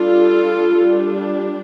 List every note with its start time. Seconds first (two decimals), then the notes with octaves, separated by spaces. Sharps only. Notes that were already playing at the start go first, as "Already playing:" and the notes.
Already playing: G3 D4 F4 A4
0.76 G3 D4